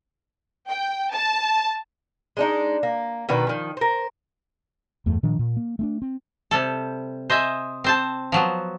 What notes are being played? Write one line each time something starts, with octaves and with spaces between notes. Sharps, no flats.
G5
A5
G#3 D4 D#4
A#3
B2 D#3 D4 B4
D#3 F3
A#4 C5
E2 G2 A3
A#2 D#3 F3 D4
A#2
A#3
A3 C4 D4
C4
C3 G3 A4
C5 D#5 E5 G#5
C4 C5 A5
F3 F#3 B3